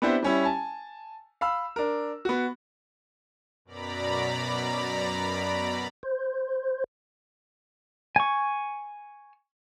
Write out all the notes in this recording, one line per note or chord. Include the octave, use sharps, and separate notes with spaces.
B3 C4 D4 E4 G4 C5
G3 C#4 E4
G#5 A5
F5 B5 E6
D4 A#4
B3 F#4
F#2 B2 D5 A#5 B5
C5
G#5 C#6